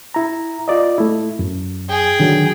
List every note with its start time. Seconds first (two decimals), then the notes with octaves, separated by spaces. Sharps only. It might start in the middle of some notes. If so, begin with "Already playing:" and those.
0.14 E4 A#5
0.68 F4 D5 D#5
0.98 A3 E4
1.39 F#2
1.89 G#4 G5
2.20 D3 D#3 F#3